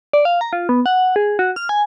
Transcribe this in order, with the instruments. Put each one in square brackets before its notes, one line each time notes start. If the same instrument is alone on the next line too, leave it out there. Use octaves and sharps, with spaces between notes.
[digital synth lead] D5
F5
A#5
F4
B3
F#5
G#4
F#4
F6
G#5